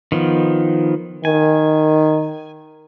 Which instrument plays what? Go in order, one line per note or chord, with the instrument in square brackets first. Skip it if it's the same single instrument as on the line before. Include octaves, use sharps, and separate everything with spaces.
[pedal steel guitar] D#3 F3 B3
[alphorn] D#3 [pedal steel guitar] G#5